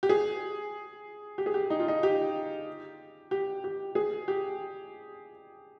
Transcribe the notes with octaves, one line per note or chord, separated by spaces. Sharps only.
G4
G#4
G4
G#4
G4
D#4
F4
D#4
G4
G4
G4
G#4
G4